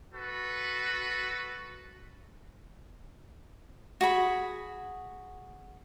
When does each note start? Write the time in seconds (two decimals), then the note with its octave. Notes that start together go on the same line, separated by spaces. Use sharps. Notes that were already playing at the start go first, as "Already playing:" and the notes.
0.13 F#4 A4 B4
4.01 F#4 G#4 B5